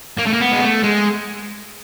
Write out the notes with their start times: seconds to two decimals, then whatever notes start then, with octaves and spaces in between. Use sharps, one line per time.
0.19 A#3
0.27 A3
0.34 A#3
0.41 B3
0.52 G#3
0.63 A3
0.83 G#3